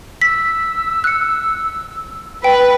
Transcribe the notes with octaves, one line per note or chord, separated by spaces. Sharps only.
E6 B6
F#6 C#7
B4 G5